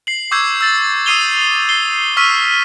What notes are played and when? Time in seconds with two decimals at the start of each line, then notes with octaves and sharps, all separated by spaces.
0.07 C7 F#7
0.31 C#6 D6 E6 G6 G#6 C7
0.61 E6 A6 F#7
1.06 D#6 E6 C7 D#7 F7 G7
1.69 C7 G7
2.17 C#6 E6 F6 B6 D#7